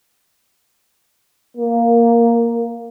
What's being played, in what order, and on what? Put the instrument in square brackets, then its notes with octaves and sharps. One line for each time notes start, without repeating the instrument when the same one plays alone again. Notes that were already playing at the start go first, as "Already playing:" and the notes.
[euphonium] A#3